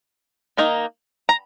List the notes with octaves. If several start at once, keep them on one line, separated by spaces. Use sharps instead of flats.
D#3 A#3 D#4
A#5